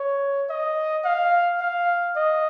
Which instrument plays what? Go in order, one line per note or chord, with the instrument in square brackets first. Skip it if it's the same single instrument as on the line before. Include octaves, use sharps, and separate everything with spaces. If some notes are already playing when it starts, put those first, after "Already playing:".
Already playing: [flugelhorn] C#5
D#5
F5
F5
D#5